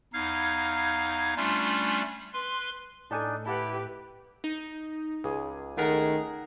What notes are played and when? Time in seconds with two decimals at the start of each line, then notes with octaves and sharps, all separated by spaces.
0.13 E2 D#4 F5 F6 G#6
1.37 G3 A3 C#4 D4 F4
2.33 B4 C6
3.11 A2 D4 D#4 A4 G#5 A5
3.46 E4 G4 B4 F#5 A5
4.44 D#4
5.24 C#2 G#4
5.77 D#3 A3 G#4 A#4 F#5 A#5